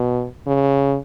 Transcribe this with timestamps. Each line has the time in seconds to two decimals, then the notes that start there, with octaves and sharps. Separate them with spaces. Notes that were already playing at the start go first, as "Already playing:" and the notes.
Already playing: B2
0.47 C#3